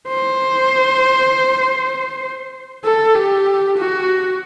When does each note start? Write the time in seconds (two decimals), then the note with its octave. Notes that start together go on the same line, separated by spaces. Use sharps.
0.08 C5
2.85 A4
3.15 G4
3.78 F#4